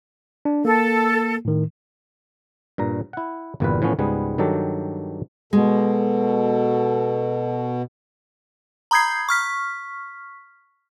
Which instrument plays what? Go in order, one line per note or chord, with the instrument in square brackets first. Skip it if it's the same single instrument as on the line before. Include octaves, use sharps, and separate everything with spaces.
[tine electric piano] D4
[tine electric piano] A#3 [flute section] A4
[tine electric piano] A2 D#3
[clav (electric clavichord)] G2 A#2 A#5
E4 F#5
G1 E2 A#2 G3 F4 B4
A2 E3 F3 B3 C#4
C#2 G#2 G3 B3 G#4
G2 D#3 F#3 G4 A4
[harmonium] B2 [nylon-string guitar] G#3 [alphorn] A4
[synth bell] A#5 B5 D#6 G6 G#6 C7
C#6 F6 B6